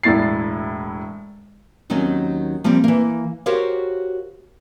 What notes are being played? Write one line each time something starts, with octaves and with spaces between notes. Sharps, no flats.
E1 A2 E4 A6 C7
D#2 D#3 F#3 C4 C#4
F3 G3 A#3 C4
E3 A#3
F#4 G4 A#4 C5 C#5 F5